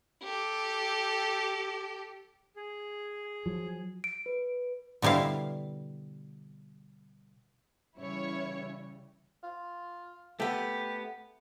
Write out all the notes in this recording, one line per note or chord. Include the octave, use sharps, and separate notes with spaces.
G4 A4
G#4
F3 F#3
D7
B4
B2 D3 G3 E4 F5
C#3 E3 G3 C#4 E4 C#5
F4
A3 B3 G4